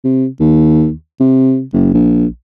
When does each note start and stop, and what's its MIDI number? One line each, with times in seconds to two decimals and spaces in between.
0.04 0.26 48
0.40 0.91 39
1.20 1.62 48
1.73 1.89 30
1.94 2.26 34